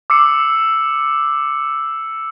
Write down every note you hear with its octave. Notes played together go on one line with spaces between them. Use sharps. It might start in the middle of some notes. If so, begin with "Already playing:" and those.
D6 E6 C7 C#7